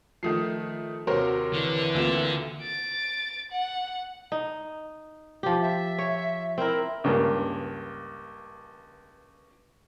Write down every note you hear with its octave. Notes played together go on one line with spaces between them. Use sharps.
D#3 F3 A3 D#6 C7
D#2 C3 F#4 A#4 C5 C#5
D3 E3
D2 A#3 C4 E4 F4 E7
A6 D7
F#5
D#4
F3 F4 G4
E5
C#5
C4 E4 A#4
C#2 G2 A#3